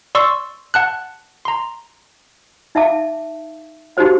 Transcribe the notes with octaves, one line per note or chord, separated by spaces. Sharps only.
D5 C6 C#6 E6
F#5 A5 F#6
A#5 C6
D#4 E5 F5 A5 D6
D#4 F#4 G4 C5 F5